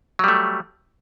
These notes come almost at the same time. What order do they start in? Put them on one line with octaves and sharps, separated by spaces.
F#3 G3 A3